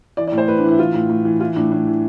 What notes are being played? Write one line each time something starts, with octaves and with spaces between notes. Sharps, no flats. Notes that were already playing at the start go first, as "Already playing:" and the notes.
E3 D5
D5
A2
C5
A2 B4
D4
E3
E4
E3 F4
A2
A2
E3
E3 F4
A2 D4
A2 D4
E3